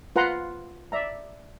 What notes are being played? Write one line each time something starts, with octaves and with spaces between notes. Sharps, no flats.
F4 B4 F#5 A#5 C6
D5 E5 A#5